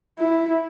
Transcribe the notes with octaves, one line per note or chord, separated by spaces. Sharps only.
E4